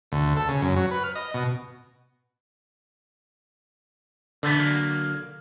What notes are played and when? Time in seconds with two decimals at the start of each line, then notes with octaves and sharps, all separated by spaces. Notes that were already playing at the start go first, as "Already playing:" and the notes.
0.12 D2
0.37 A4
0.49 C#3
0.62 F#2
0.76 F#3
0.91 B4
1.04 F6
1.15 D#5
1.34 B2
4.43 D3 E3 A3 B3
4.59 F#3 A#3